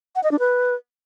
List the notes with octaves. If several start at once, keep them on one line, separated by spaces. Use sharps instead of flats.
F#5
D#5
D4
B4